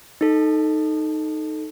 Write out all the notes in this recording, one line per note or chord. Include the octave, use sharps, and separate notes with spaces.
D#4 A4